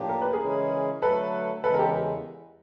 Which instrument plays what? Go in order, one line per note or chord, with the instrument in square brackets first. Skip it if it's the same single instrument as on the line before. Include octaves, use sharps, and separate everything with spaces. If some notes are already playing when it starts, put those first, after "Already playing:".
Already playing: [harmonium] A2 F3 A#3 D4 G4
[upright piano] A#4
B4
G#4 A#4
[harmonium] C#3 E3 G#3 C#4 E4
[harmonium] D3 F#3 A3 [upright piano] A4 B4
[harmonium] E2 C#3 E3 G#3 [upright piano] A4 B4
[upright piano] A#4
G4 A4